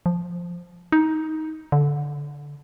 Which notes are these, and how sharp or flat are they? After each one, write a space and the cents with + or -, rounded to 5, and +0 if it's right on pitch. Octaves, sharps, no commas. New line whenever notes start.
F3 +0
D#4 +15
D3 -15